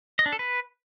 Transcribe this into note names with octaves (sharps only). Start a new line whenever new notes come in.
D#5
D4
A4
B4